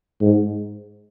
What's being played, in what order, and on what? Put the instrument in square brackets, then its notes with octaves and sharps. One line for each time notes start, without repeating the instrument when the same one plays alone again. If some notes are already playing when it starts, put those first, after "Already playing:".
[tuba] G#2